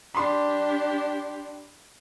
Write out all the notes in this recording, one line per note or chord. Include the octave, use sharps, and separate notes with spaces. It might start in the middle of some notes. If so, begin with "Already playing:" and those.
D4 G4 B5 C6